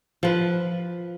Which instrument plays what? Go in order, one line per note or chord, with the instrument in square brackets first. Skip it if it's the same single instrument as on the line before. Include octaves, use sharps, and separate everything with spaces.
[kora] F3 B4